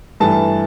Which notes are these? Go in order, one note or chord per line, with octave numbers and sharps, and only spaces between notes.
G2 E3 A3 A5